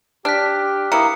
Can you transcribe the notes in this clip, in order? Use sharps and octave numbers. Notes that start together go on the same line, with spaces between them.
D4 G4 F6 F#6 B6
A#3 E4 G#4 D#6 F6 C#7